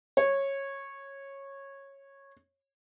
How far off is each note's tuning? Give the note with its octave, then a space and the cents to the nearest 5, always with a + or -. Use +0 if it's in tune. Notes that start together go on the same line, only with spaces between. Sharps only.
C#5 -15